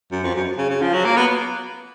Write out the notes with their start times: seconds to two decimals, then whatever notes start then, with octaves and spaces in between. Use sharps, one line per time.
0.12 F#2
0.24 F2
0.35 F#2
0.58 C#3
0.70 C#3
0.82 F3
0.94 F#3
1.05 A#3
1.17 B3